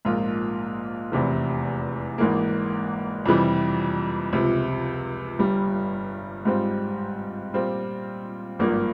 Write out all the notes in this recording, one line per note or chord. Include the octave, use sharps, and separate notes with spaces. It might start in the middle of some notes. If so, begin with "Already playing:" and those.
A#1 G#2 F3 A#3 F4
F1 E2 C3 E3
G#1 G#2 E3 A#3
F2 C3 E3 G3
C#2 C3 F3
G1 G2 G3
G#2 G3 C4 F4
A#2 G3 C4 F4
G#1 G2 F3 A#3